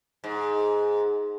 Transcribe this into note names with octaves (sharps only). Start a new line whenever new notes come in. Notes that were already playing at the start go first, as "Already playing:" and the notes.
G#2